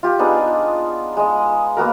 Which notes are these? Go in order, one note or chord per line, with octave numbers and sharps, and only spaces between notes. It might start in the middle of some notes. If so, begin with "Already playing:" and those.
F4 G4
B3 D4 D#4 G#4
G#3 D#5
A#3 B3 F#4 A#4